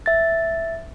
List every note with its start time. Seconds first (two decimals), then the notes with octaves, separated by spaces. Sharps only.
0.06 E5 A6